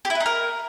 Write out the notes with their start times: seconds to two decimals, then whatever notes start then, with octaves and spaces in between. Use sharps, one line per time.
0.05 G4
0.10 E4
0.15 B4
0.20 D#4
0.26 A#4